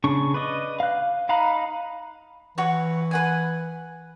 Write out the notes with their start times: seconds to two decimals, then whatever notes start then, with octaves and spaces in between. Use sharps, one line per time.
0.04 C#3 D4 C#6
0.34 B4 D5 D#5
0.80 F5 F#6
1.29 D#4 F5 A#5 B5 F#6
2.58 E3 F#4 B4 C#5
3.11 B4 F#5 G#5